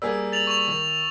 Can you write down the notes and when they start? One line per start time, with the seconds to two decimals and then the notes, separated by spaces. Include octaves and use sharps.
0.02 G3 A#3 G#4 E6
0.32 A6 F7 F#7
0.47 C#6 F7
0.68 D#3